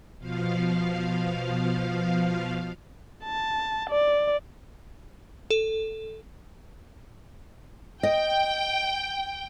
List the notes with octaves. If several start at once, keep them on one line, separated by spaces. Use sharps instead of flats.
B2 F3 F5
A5
D5
A4
D#5 G5